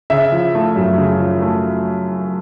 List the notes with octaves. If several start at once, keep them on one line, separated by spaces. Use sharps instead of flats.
C#3 E5
F3
A3
F#2
C#3
F3
A3